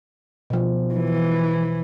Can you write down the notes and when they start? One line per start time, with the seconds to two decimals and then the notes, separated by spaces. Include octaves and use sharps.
0.50 B2 F3
0.94 E3